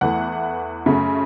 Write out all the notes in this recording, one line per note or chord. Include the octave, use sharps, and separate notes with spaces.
E2 E3 A3 F#5
F#2 C#3 A3